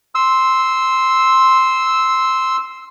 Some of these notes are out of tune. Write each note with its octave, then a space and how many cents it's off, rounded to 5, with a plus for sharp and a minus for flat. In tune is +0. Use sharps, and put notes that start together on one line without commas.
C6 +0 E6 -10